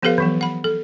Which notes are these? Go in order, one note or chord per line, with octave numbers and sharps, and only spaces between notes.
F3 B3 G4 A4 B4 F5
E3 F#3 B3
F#5 B5
A4